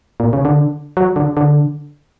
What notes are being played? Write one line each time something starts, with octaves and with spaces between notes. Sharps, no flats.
A#2
C#3
D3
F#3
D3
D3